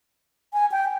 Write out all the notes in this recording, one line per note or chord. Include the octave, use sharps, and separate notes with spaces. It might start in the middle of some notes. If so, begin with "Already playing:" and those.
G#5
G5